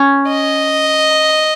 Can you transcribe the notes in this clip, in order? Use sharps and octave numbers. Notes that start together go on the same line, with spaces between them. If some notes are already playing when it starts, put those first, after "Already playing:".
Already playing: C#4
D#5